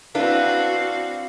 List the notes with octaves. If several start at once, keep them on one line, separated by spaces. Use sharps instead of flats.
C4 D4 E4 F#4 B4 F5